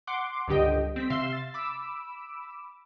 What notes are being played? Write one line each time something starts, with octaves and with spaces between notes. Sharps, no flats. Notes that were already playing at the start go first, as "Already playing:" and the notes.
F#5 C6 D6
C#2 G2 D3 G4 D#5 G5
C4 B6
C3 E5 F5 C6 C7 E7
A6
B5 D6 E6